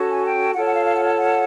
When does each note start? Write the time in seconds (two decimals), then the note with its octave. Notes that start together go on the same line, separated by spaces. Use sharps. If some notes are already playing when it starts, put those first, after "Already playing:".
Already playing: C#4 F#4 A4
0.09 G#5
0.24 G5
0.54 F4 A4 C#5 F#5
0.65 F#5
0.74 F5
0.85 F5
0.95 F#5
1.05 F#5
1.16 F#5